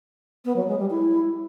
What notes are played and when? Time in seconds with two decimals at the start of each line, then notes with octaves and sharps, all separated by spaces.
0.45 B3
0.56 F#3
0.68 G#3
0.79 G3
0.90 E4